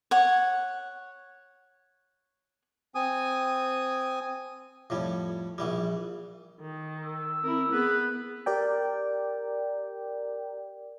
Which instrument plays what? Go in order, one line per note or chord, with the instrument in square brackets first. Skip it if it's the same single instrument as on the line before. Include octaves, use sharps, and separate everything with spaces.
[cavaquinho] C#5 F#5
[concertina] C4 G#5 D#6
[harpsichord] F2 A2 G3
A#1 E3 G3
[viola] D#3
[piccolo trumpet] E6
[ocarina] C4 [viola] E4 A#4
[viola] B3 [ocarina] G#4 [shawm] B4
[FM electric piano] G4 A#4 D5 G5